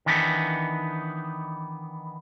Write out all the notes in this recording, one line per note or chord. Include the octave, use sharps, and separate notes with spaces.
D#3 E3 B3 D4 D#4